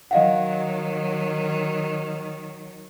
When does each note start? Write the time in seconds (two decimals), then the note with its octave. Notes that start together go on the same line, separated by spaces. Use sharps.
0.11 D#3 F#3 D#5 F5 F#5